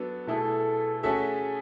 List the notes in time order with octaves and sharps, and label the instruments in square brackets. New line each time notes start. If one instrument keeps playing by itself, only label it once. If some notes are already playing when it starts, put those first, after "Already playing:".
Already playing: [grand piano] F#3 B3 D4 A4
[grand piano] B2 A3 E4 G#4 [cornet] A4
[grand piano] A3 C#4 F#4 A4 E5 [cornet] G#4